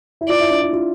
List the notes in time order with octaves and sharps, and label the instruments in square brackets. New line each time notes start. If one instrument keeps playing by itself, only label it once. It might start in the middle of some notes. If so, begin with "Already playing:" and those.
[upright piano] E4
[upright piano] F4 [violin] D5
[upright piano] E4
D4
E4
F4